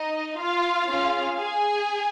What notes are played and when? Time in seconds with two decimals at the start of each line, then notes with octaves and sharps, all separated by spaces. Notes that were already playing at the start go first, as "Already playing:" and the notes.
Already playing: D#4 D#5
0.38 F4 F5
0.88 C#4 F4 G#4
1.38 G#4 G#5